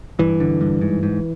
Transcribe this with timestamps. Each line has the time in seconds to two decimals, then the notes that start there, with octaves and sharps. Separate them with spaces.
0.19 G2 E3
0.40 D3
0.61 G2
0.81 G#2
1.03 G#2